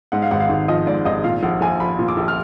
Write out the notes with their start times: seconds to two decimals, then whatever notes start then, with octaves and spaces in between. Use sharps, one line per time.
0.12 G#2 F#5
0.22 F5
0.31 G#1 F#5
0.40 F5
0.49 G#1
0.68 F3 D#5
0.87 G#2 D5
1.05 G#1 D#5
1.24 A#2 F5
1.43 A#1 F#5
1.61 A#1 G#5
1.80 F3 B5
1.99 A#2
2.08 D6
2.17 A#1
2.28 F6